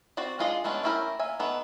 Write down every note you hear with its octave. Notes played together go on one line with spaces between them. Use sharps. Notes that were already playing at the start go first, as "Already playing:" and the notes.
C4 F#4 D5
G#3 D4 F4 G#4 D#5
G#3 A3 B3 C#4 D4
A3 C#4 E4 G4 A#4
A#3 E5 G#5
D#3 B3 A4